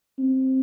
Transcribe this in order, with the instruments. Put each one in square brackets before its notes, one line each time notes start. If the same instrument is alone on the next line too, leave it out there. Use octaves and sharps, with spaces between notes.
[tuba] C4